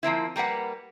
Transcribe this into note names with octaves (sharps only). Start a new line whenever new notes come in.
F3 A#3 C4 E4
G3 A#3 B4 F#5